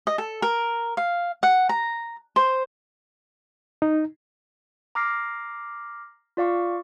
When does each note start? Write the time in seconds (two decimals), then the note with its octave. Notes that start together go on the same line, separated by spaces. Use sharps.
0.07 D#5
0.18 A4
0.42 A#4
0.97 F5
1.43 F#5
1.69 A#5
2.36 C5
3.82 D#4
4.95 A#5 D6 F6 A#6 C7
6.37 F4 D5 F5 C#6